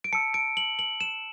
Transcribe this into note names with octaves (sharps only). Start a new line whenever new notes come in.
D7
A5 E6 C#7
D7
F#7
F#7
E7